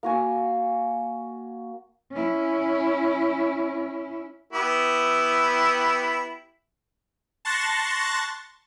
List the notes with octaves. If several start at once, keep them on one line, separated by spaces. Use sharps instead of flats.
A#3 F#4 G#5
C#4 E4
B3 E4 G4
A5 C6 C#6 F#6 A6 A#6